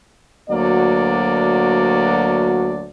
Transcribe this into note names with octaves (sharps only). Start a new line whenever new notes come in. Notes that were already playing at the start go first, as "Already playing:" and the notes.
D2 F#3 A#3 F#4 D5